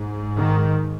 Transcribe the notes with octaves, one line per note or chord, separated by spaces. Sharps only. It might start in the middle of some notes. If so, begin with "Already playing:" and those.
Already playing: G#2
D#3